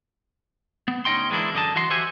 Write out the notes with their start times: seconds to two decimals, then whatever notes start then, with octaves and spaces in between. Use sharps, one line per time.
0.88 B3
1.05 D2 C#4 D#4 D#5 G5 C6
1.30 E3 G#3 A#3 D4 E4
1.53 F#2 D3 D#5 A5
1.75 E3 F#4 D#5 C6
1.90 F#4 G4 C5 E5 F#5 G#5